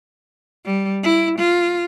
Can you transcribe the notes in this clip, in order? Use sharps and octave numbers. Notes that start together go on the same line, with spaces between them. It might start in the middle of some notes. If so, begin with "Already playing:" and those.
G3
E4
F4